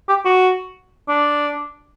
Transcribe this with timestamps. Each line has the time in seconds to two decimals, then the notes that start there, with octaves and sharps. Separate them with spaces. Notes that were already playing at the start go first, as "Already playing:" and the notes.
0.09 G4
0.25 F#4
1.08 D4